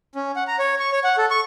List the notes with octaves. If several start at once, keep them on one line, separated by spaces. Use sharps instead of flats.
C#4
F#5
A#5
C#5
C#6
C#5
F#5
A4
C#6